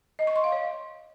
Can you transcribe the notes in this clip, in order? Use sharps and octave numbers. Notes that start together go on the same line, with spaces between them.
D#5
C#6
C6
F5
C#5